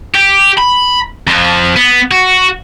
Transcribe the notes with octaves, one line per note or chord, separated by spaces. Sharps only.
G4
B5
F2 F3
B3
F#4